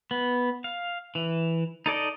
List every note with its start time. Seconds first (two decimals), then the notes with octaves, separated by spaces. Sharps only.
0.11 B3
0.64 F5
1.15 E3
1.86 D#4 A4 D5 D#5